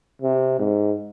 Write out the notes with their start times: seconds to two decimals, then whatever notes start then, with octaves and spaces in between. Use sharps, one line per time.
0.22 C3
0.59 G#2